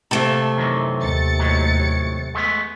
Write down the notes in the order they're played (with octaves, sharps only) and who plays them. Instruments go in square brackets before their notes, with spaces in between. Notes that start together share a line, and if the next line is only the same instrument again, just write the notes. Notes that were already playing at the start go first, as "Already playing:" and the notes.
[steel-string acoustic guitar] C3 A3 C4 [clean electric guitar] A#3 A5
[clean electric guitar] F#2 D#3 E3
[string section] D#2 A6 C#7
[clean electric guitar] A2 D#3 F#3
G#3 A3 B3